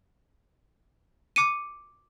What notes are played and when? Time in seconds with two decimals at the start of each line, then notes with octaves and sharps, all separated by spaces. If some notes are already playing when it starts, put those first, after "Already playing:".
1.36 D6 C#7 D#7